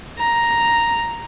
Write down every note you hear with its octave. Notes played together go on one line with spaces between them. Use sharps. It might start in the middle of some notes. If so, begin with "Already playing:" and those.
A#5